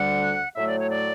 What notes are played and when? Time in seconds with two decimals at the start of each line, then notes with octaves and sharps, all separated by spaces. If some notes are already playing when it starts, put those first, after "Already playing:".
Already playing: D2 D3 G3 F#5
0.56 A2 F#3 A3 E5
0.67 D5
0.79 C#5
0.89 D5